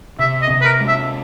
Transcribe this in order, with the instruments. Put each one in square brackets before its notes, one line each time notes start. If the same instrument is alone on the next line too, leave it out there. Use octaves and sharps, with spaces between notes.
[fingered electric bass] C3 [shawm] E5
[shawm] D#5
[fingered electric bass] C3
[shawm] B4
A#4
[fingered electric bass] G#3
[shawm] E5